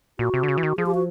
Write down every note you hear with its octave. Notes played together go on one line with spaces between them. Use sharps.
A#2 F#4
C3
D3
C#3
E3
D#3
F3 G#4
G4
F#4